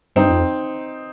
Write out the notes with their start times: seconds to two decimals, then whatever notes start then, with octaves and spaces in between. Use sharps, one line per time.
0.16 G2 C4 D#4
0.30 F2